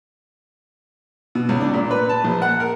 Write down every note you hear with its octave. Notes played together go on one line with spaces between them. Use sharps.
B2
C#2
D4
A#2
B4
A5
A#1
F#5
A#4